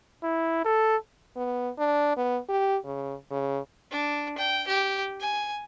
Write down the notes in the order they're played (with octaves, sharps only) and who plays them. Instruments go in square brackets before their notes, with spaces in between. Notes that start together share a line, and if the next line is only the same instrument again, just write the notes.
[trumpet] E4
A4
[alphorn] B3
D4
B3
G4
C#3
C#3
[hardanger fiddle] D4
G5
G4
G#5